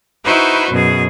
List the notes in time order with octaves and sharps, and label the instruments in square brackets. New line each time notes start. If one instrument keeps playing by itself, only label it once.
[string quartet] D#4 E4 F#4 B4 C5 C#6
F#2 B2 G#4